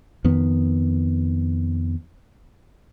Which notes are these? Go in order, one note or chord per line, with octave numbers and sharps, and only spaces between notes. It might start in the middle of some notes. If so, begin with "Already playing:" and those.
F2 D#3 B3